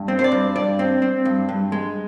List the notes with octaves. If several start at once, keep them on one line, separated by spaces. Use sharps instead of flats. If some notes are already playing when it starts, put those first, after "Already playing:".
Already playing: G2
C4
C5
D5
G2
G2 D5
C4
C4
G2
G2
G#3